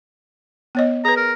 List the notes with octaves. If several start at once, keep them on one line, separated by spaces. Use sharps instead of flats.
B3 C#5 D#5
G#4 B4 A#5
A#4